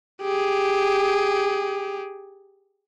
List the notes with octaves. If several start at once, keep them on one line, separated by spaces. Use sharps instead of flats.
G4 G#4